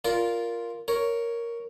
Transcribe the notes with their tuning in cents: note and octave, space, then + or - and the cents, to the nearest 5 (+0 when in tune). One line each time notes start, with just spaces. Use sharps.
F4 +0 A#4 +0 D5 -25
A#4 +0 C#5 +5